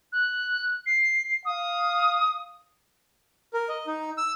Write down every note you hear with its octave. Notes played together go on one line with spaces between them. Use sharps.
F#6
C7
F5 D#6
A#4
D#5
D#4
E6